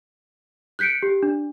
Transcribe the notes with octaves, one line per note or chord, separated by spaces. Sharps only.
F#6 G6 B6 C#7 D7
G4
D4